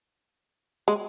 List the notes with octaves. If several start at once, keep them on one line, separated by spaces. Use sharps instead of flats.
G#3